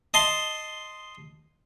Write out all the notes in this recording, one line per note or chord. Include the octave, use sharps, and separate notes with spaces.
D#5 A5 C6